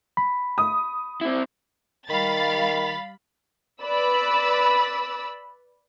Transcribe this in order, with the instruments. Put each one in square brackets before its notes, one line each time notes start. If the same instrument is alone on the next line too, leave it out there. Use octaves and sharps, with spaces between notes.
[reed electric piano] B5
[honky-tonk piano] D#6
[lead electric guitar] C4 E4
[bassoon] D#3 [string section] G3 F5 A6 [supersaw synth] B5
[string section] B4 D5 B5 E6